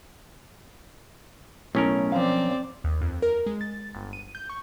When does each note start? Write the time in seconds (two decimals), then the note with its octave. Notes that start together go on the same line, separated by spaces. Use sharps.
1.75 B1 A2 C#4 E4 A#4
2.12 F3 C4 D5 F5
2.84 D#2
3.01 F2
3.22 A#4
3.46 G#3
3.61 A6
3.95 G1
4.13 D#7
4.35 G6
4.49 C#6